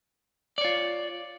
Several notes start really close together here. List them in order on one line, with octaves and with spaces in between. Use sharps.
D5 C#5 F4